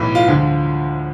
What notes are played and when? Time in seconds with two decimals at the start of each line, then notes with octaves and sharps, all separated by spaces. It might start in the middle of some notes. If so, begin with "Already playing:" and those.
Already playing: B1 A2 E3
0.15 F4
0.28 D2 D3 F3 G#3